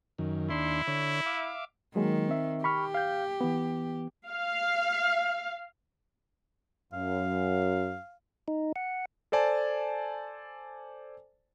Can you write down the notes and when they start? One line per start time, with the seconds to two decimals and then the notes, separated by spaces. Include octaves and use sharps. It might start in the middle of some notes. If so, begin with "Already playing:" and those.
0.18 F#2 D#3
0.50 D#2 D4 E4 C6
0.87 D3 C#5
1.26 E5 F5 D6
1.96 D#3 F#3 G#3 A#3
2.28 C4 E5
2.64 G4 B5 C#6 F6
2.94 F5 G6
3.41 E3 B3
4.28 F5
6.93 F#2 F5
8.48 D#4
8.76 F#5
9.32 A4 C5 D5 G#5 A5